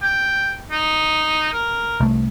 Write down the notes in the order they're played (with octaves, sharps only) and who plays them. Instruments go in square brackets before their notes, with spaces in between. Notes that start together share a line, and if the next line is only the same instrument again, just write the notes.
[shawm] G5
D#4
A#4
[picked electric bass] C2 A3